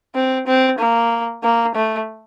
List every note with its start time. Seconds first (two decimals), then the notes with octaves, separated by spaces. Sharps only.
0.15 C4
0.47 C4
0.79 A#3
1.43 A#3
1.75 A3